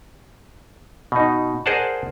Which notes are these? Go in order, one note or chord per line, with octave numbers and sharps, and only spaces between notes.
B2 D#4
G#4 A#4 C5 D5 F#5 A5